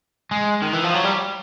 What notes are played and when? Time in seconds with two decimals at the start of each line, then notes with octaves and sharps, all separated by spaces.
0.31 G#3
0.62 D#3
0.73 E3
0.83 F3
0.94 F#3
1.04 G3